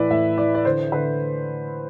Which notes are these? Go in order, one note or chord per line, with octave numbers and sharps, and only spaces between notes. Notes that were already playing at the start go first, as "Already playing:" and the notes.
Already playing: A2 E3 E4 B4 D5
A2 E5
E3 D5
D5
D3 C5
D3 B4